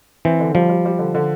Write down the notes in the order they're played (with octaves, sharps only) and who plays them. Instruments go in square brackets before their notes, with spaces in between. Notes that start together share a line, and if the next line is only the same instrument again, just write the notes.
[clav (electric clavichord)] E3 [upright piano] C4
[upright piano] D3
[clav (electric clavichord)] F3 [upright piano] G3
[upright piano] G3
G3
D3
D3